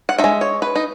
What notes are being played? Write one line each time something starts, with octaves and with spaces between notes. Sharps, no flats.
F#5
D#4 E5
G#3
C#5
B4
D#4